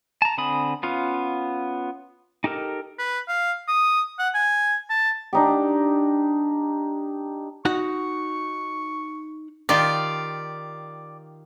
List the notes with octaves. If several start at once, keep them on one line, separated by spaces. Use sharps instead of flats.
A5 A#5
D3 C4 G#5 B5 D#6
B3 C#4 F4 F5
D#4 G4 A4 A#4
B4
F5
D#6
F#5
G#5
A5
D4 D#4 G4
D#4 F#4 F#5 C#6
D#3 F4 G4 D5